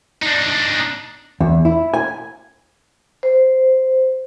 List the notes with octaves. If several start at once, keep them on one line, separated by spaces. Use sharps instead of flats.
D4 D#4
E2
E4
G#5
C5